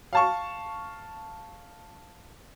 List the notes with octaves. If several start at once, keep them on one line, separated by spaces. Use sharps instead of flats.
F5 A5 C#6